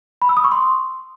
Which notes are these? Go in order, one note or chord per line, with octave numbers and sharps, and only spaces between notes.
B5
E6
D#6
C#6
C6